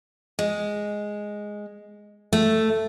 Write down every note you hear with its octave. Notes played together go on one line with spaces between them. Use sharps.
G#3
A3